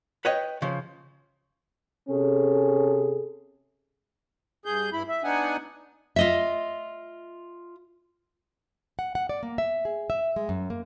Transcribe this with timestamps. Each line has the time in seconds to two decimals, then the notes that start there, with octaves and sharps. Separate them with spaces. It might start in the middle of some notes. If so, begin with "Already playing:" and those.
0.25 B4 C#5 D#5 G5
0.62 C#3 F3
2.09 C3 C#4 G#4 A4
4.65 G2 G#4 G6
4.93 G2 E4 B5
5.08 E5
5.24 B3 D4 D#4 F#5 G#5
6.16 F4 D#5 E5
8.99 F#5
9.15 F#5
9.29 D5
9.43 A#3
9.58 E5
9.85 G#4
10.10 E5
10.36 G#3
10.49 F#2
10.70 A#3